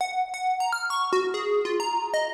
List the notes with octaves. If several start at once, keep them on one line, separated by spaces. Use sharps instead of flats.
F#5
F#5
A#5
F6
C#6
F#4
G#4
F4
A#5
D#5